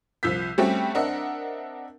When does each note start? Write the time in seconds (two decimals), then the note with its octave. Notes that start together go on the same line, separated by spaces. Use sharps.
0.23 C2 F3 E6 G6 B6
0.58 G3 A3 C4 C#4 F#4 G4
0.95 C4 D4 A#4 D#5 E5 F#5